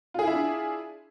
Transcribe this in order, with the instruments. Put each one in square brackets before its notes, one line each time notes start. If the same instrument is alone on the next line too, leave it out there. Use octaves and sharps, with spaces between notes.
[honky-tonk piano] F4
G#4
E4
E5
D4